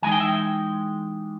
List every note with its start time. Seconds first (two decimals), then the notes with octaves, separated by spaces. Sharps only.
0.02 E3 G#3 D#4 G#5
0.12 G5
0.20 E5
0.29 G5